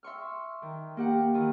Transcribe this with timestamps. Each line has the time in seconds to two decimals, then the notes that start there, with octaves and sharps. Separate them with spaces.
0.03 E5 C6 C#6 F6
0.62 D#3
0.97 A#3 G4 F#5
1.34 D#3 E3